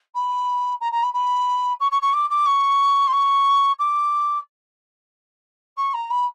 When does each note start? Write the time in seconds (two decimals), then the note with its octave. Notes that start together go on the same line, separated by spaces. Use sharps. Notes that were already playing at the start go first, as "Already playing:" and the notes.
0.14 B5
0.80 A#5
0.92 A#5
1.02 B5
1.13 B5
1.80 C#6
1.91 C#6
2.01 C#6
2.13 D6
2.30 D6
2.46 C#6
3.07 C6
3.12 C#6
3.79 D6
5.77 C#6
5.93 A#5
6.10 B5